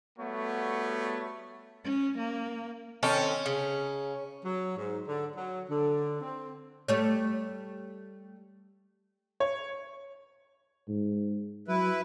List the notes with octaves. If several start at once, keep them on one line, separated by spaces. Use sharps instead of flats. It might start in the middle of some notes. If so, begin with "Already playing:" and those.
G3 A3 B3 F#4 C#5
C#4
A#3
D#3 C4 C#4 A4
C#3
F#3
G#2
D3
F#3
D3
C4
G3 A3 C#5
C#5
G#2
F#3 E4 B4